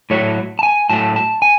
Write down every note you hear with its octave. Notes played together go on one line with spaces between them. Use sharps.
A2 F#3 A3 C#5
A5
G#5
A2 F#3 A3 A5
A5
G#5